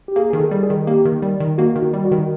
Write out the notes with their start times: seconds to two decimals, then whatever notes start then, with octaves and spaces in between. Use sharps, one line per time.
0.08 G4
0.16 A#3 G#4
0.30 D#3 G#4
0.40 A4
0.51 G3
0.63 G#4
0.70 D#3
0.87 A#3 G4
1.05 D#3
1.22 G3
1.40 D#3
1.58 A#3 F#4
1.76 D#3
1.82 F#4
1.93 G3
2.05 F#4
2.12 D#3